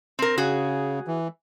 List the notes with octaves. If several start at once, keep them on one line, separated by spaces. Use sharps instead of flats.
C4 A#4
C#3 F#4 G#4
E3